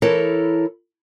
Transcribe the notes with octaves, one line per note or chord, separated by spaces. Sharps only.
E3 E4 A4 A#4 C#5